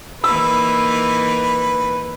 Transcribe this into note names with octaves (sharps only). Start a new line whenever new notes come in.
E3 A#3 D#4 B4 E6